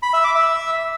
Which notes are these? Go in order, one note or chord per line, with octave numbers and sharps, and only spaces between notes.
B5
E5
D6
E5